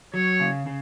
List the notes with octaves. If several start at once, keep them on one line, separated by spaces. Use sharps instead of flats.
F#3 C#5
C#3
C#3